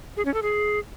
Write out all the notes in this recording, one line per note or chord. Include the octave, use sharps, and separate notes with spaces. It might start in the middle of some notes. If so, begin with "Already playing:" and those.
G#4
C#4
A4
G#4